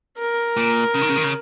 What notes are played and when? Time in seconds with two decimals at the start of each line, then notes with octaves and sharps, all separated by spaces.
0.18 A#4
0.57 A#2
0.94 C#3
1.01 D#3
1.08 C#3
1.16 D#3
1.23 C#3